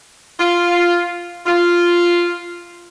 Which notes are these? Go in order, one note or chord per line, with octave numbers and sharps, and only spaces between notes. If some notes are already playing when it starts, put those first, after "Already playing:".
F4
F4